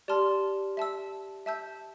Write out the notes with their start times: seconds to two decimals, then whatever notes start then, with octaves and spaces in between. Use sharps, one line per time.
0.08 G4 D5 A5 C6 F6
0.77 E5 A5 E6
1.46 E5 A5 E6 G6